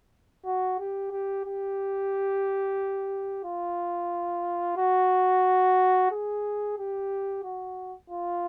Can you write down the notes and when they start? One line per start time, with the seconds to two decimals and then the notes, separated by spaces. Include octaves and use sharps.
0.45 F#4
0.79 G4
1.11 G4
1.45 G4
3.44 F4
4.77 F#4
6.11 G#4
6.78 G4
7.44 F#4
8.10 F4